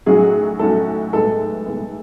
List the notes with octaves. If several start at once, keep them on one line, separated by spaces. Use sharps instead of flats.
B1 A2 F#3 C#4 F#4 G#4
B1 A2 F#3 C#4 F#4 A4
B1 A2 G#3 B3 A4
B1 A2 G#3 B3